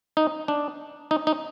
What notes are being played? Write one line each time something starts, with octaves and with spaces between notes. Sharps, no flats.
D#4
D4
D#4
D#4